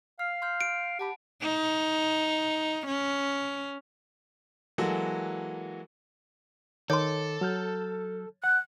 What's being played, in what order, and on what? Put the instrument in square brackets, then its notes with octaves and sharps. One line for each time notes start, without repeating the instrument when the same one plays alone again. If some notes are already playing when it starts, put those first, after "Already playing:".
[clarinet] F5 [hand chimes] F6
[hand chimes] C6 F6 G6
[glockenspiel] D7
[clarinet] G4 [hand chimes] F#5 A5 B5
[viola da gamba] D#4
C#4
[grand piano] E3 F#3 G#3 A#3 F#4 A4
[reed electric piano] D#3 D6 [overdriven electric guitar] A4 [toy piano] C#5 C6
[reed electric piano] F#3 F6 G6
[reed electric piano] F#5 [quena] F#6